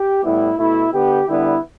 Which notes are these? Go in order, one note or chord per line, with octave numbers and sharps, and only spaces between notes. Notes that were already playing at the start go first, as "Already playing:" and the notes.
Already playing: G4
A2 G3 B3 E4
B2 A3 E4
D3 B3 G4
D3 G3 B3 E4